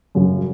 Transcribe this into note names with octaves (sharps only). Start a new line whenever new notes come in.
F#2 C#3 F#3